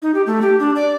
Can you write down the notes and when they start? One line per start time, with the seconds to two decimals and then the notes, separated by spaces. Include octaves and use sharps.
0.02 D#4
0.15 G4
0.26 A3
0.42 G4
0.59 D4
0.76 D5